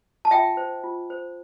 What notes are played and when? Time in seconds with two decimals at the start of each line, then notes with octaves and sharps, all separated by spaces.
0.25 A5
0.31 F4 E5 G5
0.57 C5
0.84 F4
1.10 C5